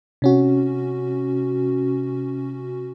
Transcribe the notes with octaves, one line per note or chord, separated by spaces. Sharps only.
C3 C#4 F#4